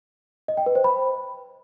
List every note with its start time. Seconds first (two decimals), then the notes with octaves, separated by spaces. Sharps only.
0.48 D#5
0.57 G5
0.66 B4
0.75 C5
0.84 B5